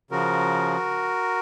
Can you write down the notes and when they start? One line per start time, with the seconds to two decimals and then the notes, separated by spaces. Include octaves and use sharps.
0.11 C#3 F3 F#4 A#4